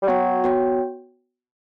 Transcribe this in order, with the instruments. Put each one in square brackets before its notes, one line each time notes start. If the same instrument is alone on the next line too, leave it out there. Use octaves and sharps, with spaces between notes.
[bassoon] G3
[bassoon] F#3 [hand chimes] B3 F#4 C#5 G5
[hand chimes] B3 F#4 C#5 G5